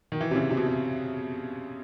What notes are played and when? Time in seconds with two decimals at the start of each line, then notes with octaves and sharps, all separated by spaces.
0.12 D#3
0.21 E3
0.31 C3
0.35 C#3
0.50 C3
0.57 B2
0.66 C3